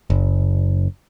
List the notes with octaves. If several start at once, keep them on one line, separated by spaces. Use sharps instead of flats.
F#1